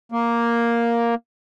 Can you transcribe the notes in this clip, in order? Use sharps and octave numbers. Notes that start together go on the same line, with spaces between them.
A#3